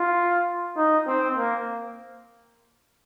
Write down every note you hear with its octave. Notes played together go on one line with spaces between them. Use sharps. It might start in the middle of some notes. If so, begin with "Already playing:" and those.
Already playing: F4
D#4
C4
A#3